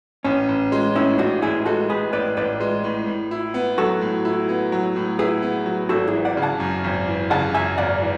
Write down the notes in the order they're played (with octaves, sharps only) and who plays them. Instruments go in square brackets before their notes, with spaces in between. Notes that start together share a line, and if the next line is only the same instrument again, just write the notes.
[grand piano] A1 [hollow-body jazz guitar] C#4
[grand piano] A1
G#3
[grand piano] A2 [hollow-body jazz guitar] C#4 E4
[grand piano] A1 [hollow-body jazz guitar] D4 F#4
[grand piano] A1 [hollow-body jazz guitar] E4 G#4
[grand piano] G#3 [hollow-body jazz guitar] F#4 A4
[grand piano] A2 [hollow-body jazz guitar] G#4 B4
[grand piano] A1 [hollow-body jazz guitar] B4 D5
[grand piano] A1 [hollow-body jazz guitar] B4 D5
[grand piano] G#3
A2
A2
E4
B3
[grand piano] F#3 [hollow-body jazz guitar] F#4 A4
[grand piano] A2
E4
B3
F#3
A2
[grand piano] E4 [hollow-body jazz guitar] G#4 B4
[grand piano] B3
F#3
[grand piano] G#1 [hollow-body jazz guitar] F#4 A4
[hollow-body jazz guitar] E4 G#4
[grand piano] E3
[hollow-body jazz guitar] D5 F#5
[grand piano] C#3
[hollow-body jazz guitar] F#5 A5
[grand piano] F#2
G#1
E3
[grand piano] C#3 [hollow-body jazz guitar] F#5 A5
[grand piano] F#2 [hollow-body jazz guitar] E5 G#5
[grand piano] G#1 [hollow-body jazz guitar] D5 F#5
[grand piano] E3